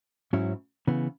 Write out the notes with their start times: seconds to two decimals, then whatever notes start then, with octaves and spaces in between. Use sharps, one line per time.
0.33 G#2 F#3 C#4 E4
0.87 C#3 E3 B3